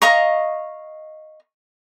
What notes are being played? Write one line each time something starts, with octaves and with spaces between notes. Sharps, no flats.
D#5 F5 A#5 C#6